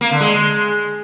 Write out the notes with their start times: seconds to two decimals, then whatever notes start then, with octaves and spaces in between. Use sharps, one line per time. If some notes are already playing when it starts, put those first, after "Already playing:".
0.01 A#3
0.11 D3
0.21 G#3